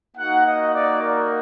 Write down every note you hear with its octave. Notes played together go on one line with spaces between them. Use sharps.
A#3 D#4 F#4 F#5
D#5
D5
A#4